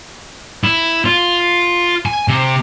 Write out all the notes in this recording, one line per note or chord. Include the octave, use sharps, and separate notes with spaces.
E4
F4
G#5
C3